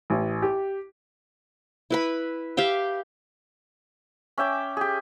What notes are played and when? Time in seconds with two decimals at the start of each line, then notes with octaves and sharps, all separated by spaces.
0.10 A1
0.42 G4
1.90 E4 B4 B5
2.57 G4 E5 F5 G5
4.38 C#4 E5 G5 D6
4.77 G4 G#4